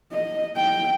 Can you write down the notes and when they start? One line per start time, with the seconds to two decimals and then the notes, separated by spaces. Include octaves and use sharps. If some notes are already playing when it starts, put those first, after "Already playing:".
0.12 D#5
0.57 G5